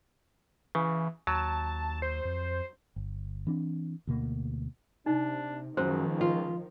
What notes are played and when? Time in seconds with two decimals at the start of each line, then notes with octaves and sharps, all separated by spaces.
0.75 C#3 E3
1.27 D#2 F#3 A5
2.02 C5
2.25 F2
2.96 G1
3.47 E3 C4 D4
4.07 D2 B2 A#3
5.06 C3 D4 D#4
5.77 C#2 F#2 D#3 F3 C5
6.21 F4